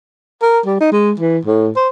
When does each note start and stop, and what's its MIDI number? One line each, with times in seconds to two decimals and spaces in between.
0.42 0.60 70
0.66 0.79 55
0.80 0.92 63
0.92 1.13 56
1.19 1.39 52
1.45 1.71 45
1.76 1.88 72